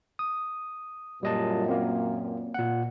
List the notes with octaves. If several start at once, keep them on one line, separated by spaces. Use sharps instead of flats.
D#6
F#2 A#2 G3 D#5 A5
A#3 C4
A#2 F#5